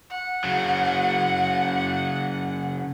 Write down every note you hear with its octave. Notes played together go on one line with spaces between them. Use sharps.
F#5
C#3 F#3